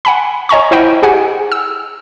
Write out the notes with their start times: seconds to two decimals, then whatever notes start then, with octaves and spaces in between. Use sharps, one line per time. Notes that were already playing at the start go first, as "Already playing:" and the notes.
0.05 F#5 G#5 B5
0.49 C#5 D#5 G#5 A#5 C#6
0.71 E4 C5 D#5 F#5 G5 B5
1.03 G4 G#4 F#5 G#5
1.52 E6